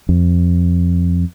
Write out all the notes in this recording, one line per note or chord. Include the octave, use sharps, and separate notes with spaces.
F2